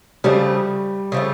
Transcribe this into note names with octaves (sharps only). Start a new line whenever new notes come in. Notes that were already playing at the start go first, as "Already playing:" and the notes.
C#3 F3 G3 A3
C#3 F3 A3